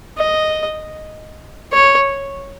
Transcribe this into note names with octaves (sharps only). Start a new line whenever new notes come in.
D#5
C#5